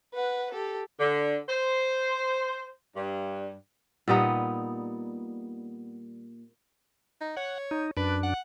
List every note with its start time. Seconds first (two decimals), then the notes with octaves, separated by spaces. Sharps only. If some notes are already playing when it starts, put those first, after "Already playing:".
0.14 B4 F#5
0.52 G4 A4
0.99 D3
1.48 C5
2.95 G2
4.08 A#2 G3 B3 D#4
7.21 D#4
7.37 C#5 F#5
7.71 D#4
7.97 F#2 D4 B4
8.23 F#5